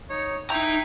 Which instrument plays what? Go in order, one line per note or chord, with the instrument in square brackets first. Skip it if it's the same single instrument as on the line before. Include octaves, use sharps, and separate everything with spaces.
[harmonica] D#4 C#5
[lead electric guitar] D#4 A#5 [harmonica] E4 G5